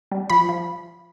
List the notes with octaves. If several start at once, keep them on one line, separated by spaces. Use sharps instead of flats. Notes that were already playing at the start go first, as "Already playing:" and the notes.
G3
F3 B5
F3